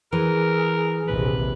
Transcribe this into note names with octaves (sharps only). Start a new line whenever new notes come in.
E3 G#4 A#4
A#1 D#2 C3 B4